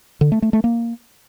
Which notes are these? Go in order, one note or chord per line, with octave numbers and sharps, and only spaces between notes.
D3
A3
A3
A3
A#3